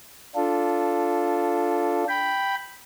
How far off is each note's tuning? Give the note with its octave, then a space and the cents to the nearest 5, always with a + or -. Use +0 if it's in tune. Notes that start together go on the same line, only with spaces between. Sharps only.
D4 -15 F4 +0 A4 +0
G5 +0 B5 +0